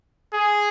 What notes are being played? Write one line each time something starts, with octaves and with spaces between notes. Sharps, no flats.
G#4